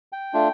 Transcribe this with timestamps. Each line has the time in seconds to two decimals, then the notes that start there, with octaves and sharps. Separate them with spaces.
0.13 G5
0.34 A3 D4 F4